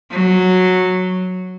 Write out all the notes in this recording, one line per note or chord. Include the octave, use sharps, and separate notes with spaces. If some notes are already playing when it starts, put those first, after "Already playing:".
F#3